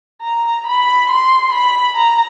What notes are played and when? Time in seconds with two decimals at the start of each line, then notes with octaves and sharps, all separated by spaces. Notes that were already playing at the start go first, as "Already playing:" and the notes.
0.22 A#5
0.67 B5
1.10 C6
1.53 B5
1.97 A#5